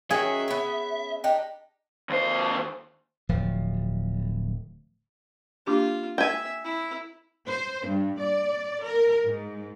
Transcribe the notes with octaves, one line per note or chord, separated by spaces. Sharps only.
D#3 F#3 C#4 G#4 E5
B3 C#4
D4 D#4 G4
D#2 C5
D1 F3
A#3 D4 F4 G4
E5 G5 G#5
E4
C5
G2
D5
A#4
G#2